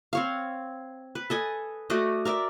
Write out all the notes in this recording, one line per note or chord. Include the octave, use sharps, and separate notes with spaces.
C4 C#5 F5
B4
A4 D#5 G#5
A3 F#4 D5 D#5
A#4 D5 E5